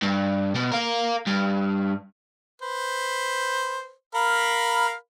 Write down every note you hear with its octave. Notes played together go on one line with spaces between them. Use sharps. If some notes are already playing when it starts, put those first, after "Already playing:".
G2
B2
A#4 F5
G2
B4 C5
A#4 F5 B5